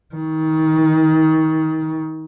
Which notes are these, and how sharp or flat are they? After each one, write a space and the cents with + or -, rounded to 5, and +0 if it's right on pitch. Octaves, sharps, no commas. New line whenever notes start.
D#3 +25